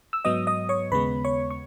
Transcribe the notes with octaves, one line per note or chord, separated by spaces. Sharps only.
E6
G#2 F#3 B3 D#5 D#6
D#5 D#6
C#5 C#6
D#2 C#3 G#3 B3 B4 B5
C#5 C#6
C#6